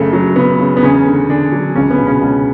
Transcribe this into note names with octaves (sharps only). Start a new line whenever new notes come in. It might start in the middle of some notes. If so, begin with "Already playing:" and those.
Already playing: F#1 C#3 A3
F#3
C#3 B3
C#3
B3
E2 C#3 C#4
D3
E2 D3 D4
F#3
C#2 C#3 C#4
B3
B2
C#3 C#4
C#2